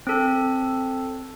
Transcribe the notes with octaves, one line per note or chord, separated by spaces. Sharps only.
C4 A4